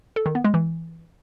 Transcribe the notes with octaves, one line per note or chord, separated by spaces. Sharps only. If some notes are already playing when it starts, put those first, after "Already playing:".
A4
D#3
B3
G#3
E3